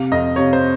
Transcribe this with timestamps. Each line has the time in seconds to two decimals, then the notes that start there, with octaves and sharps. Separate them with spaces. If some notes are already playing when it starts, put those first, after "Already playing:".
Already playing: C3 F5
0.11 F2 D#5
0.36 C3 C#5
0.53 C5